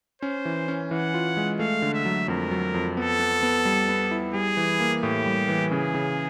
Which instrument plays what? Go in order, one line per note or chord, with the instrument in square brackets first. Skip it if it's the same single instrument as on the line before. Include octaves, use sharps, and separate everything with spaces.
[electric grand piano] C#4 [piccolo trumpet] C5
[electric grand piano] E3
C#4
[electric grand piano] E3 [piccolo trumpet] F#5
[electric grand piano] F4
G#3
[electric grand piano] A3 [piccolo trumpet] F5
[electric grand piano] D3
[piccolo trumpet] E5
[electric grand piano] F#3
[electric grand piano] F2 [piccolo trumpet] A#4
[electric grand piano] F#3
F2
[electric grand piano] B3 [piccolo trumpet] A4
[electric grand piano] B3
B3
G3
B3
E4
[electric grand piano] G3 [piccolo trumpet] G#4
[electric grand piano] E3
A#3
[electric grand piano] A2 [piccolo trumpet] G4
[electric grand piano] G3
E3
[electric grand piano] C#3 [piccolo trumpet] G#4
[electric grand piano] C#3